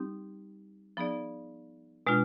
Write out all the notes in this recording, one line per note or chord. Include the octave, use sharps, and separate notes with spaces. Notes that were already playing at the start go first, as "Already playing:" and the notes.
Already playing: G3 C4 D#4 G4
F3 B3 D#4 G#4 D5
B2 G#3 D4 F4